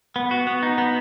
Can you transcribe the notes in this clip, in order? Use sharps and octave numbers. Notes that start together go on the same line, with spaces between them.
B3
F#4
B3
D#4
B3